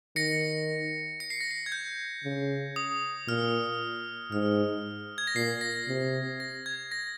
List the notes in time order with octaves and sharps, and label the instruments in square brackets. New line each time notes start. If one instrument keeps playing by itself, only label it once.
[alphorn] D#3 [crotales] A#6 C#7
[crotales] C#7
C7
A#6
C7
G#6
G6
[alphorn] C#3
[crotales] D#6
[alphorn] A#2 [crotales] F6
[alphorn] G#2 [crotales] F6
[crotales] G#6
A#6
[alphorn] A#2 [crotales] C7
[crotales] A#6
[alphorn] C3
[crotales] A#6
G#6
A#6